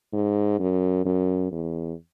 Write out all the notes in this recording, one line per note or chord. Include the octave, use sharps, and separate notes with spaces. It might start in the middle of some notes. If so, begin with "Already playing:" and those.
G#2
F#2
F#2
E2